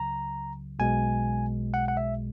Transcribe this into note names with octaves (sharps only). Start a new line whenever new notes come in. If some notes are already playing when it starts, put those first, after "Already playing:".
Already playing: C#2 C#3 F#3 A#5
B1 B2 G#3 G#5
F#5
F#5
E5